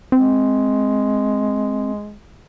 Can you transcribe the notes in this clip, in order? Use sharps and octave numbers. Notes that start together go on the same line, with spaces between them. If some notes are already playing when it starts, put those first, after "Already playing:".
G#3 C4